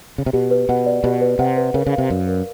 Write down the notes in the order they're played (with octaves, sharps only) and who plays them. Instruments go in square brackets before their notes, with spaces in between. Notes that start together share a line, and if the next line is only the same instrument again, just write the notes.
[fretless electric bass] C#3
C3
[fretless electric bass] B2 [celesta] G4
[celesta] B4
[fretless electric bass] B2 [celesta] F#5
[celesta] D5
[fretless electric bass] B2 [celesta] G4
[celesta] B4
[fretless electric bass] C3 [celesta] F#5
[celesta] B4
[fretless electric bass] C#3 [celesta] A#4
[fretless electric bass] C#3
[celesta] F5
[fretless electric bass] C3
[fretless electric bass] F#2 [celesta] D5
[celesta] A#4